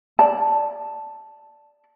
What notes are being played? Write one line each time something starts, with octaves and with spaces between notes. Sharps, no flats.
D5 A5